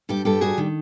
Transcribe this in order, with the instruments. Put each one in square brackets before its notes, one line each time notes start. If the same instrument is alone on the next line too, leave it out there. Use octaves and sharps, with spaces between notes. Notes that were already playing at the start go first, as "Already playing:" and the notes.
[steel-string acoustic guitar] G2 G4 A4
G2 G4 A4
G3 F#4 G#4
D#3